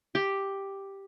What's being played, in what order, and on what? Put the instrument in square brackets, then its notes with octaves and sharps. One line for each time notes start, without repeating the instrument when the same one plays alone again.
[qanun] G4